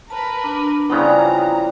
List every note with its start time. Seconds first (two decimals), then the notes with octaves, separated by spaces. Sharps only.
0.10 A#4 B4 A5
0.44 D4
0.90 C#3 F3 G3 B3 C4 E4 A#5
1.23 B4